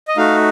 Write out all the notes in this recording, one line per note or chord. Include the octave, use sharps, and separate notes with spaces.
D#5
A3 D#4 F#4 F5